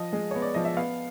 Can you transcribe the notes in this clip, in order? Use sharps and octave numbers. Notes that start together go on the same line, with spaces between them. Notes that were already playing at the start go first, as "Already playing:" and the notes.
Already playing: F3 D#5
G#3
B3 C#5
D5
F3 D#5
E5
B3 F5